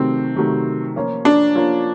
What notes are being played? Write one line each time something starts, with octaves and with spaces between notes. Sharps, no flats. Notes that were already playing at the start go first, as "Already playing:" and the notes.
Already playing: C3 D#3 F#3 A3 C4
C3 D#3 F#3 A3
F3 A#3 C#4 F4
D4
F3 A#3 C#4 F4